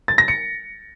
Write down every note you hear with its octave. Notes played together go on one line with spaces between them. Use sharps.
A6
A#6
C#7